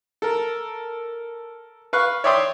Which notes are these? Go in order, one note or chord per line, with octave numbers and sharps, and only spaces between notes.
A4 A#4
B4 F5 C#6 F#6
C#5 D5 E5 G5 C6 D#6